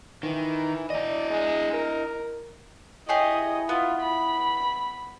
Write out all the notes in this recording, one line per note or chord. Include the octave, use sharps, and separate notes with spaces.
D#3 E3
E4 D5 D#5
G#3
A#4
E4 G4 G#4 C#5 D#5
B3 F4
B5